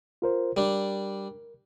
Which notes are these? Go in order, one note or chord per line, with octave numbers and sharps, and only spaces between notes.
F4 A#4 C5
G3 D4 A#4